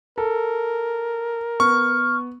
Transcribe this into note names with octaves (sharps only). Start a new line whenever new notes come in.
A4 A#4
B3 C#6 F6